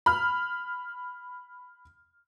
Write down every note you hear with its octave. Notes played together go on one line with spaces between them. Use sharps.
B5 F6